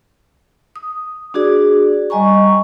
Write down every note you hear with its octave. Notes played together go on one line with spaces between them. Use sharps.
D#6
D4 F#4 G#4 D5
G3 D#5 G#5 A#5 C#6